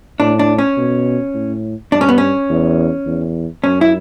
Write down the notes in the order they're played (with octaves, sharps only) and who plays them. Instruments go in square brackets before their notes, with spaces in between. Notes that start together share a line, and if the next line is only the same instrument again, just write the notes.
[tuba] A2 [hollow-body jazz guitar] D4
[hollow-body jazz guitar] D4
C#4
[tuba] B2
A2
[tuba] G2 [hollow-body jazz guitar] D4
[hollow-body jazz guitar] C#4
B3
C#4
[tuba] E2
E2
[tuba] F#2 [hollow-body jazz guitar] C#4
[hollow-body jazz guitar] E4